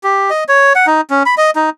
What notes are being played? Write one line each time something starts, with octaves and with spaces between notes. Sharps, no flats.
G4
D#5
C#5
F#5
D#4
C#4
B5
D#5
D#4